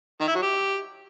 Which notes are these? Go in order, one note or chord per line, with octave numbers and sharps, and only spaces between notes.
D#3
E4
F#3
G4